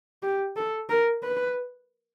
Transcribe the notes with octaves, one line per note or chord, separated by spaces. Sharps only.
G4
A4
A#4
B4